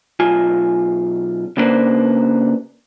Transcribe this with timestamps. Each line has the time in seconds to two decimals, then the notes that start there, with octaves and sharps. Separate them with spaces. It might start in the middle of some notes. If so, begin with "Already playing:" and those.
0.20 B1 F4 G#5
1.57 C#3 A#3 B3 D4 B4 C5